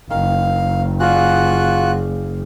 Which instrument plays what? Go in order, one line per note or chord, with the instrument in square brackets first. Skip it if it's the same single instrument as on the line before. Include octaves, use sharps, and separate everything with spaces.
[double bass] F#1 [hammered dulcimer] D#3 [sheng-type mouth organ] F5
[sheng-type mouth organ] F4 F#4 F#6 [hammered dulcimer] G#4 D5 F5